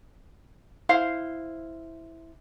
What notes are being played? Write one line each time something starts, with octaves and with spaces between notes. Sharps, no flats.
E4 C5 F5